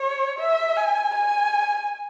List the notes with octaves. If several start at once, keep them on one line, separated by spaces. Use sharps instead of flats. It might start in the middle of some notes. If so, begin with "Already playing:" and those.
Already playing: C#5
E5
G#5
G#5